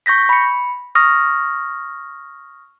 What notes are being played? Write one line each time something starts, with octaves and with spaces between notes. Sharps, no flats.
C#6 G6 A#6 B6
B5 C#7
C#6 D#6 F6 A#6